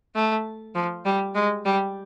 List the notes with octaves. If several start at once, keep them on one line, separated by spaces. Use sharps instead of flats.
A3
F3
G3
G#3
G3